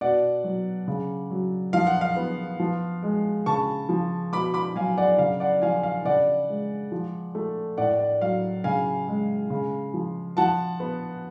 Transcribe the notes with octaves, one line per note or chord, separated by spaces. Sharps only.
B2 D5 F#5
F#3
C#3
F#3
F3 F5
F#5
F5
B3
F3
G#3
C#3 A5 C#6
F3
B2 B5 D6
B5 D6
F#3 F5 G#5
D5 F#5
C#3 F5
D5 F#5
F3 F5 G#5
F5
C#3 D5 F#5
G#3
F3
A3
A2 D5 F#5
D5
F#3 F5
C#3 F5 G#5
G#3
C#3
F3
F3 F#5 A5
B3